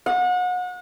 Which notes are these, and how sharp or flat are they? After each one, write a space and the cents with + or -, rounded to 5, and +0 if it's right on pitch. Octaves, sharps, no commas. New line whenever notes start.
F#5 -35